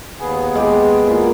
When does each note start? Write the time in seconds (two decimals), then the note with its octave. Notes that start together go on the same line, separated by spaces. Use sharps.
0.20 D#2 B3 G#4
0.55 G#3 G4
1.07 A#2